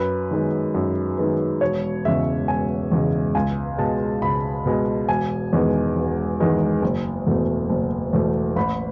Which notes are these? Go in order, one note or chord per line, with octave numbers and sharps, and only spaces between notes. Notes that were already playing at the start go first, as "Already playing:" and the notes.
Already playing: F#2 B4
D#3 G#3 B3
F#2
D#3 G#3 B3
E1 C#5
E2 C#3 G#3 E5
E1 G#5
E2 C#3 G#3
C#2 G#5
B2 G#3 A5
C#2 B5
B2 G#3
E1 G#5
E2 D#3 G#3 B3
E1
E2 D#3 G#3 B3
F#1
E2 B2 A3
F#1
E2 B2 A3
A1 B5